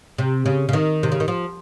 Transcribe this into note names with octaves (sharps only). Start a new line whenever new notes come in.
C3
C#3
C#3
D#3
C3
C#3
D#3
F3